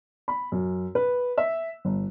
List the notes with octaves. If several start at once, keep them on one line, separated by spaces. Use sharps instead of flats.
B5
F#2
B4
E5
G1